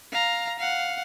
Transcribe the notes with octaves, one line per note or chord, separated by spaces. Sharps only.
F5 A#5
F5 F#5